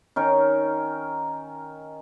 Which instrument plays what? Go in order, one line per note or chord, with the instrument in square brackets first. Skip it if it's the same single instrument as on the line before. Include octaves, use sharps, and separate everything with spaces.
[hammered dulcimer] D#3 C#4 A#4